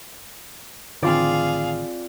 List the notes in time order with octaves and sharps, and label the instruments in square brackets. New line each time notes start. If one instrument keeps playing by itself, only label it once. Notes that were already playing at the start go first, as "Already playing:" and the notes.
[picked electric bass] A1 D3 D#3 [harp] C4 F4 D5 [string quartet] G#4 F5